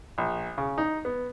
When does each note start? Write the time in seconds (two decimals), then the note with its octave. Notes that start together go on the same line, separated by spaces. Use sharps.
0.18 A#1
0.58 C#3
0.78 D#4
1.05 B3